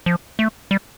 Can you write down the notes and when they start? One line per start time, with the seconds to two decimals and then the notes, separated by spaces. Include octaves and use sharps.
0.06 F3
0.39 A3
0.71 G3